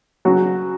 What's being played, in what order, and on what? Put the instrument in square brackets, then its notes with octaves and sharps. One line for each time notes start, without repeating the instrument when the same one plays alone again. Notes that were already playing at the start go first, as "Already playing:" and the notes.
[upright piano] C#3 F#3 F#4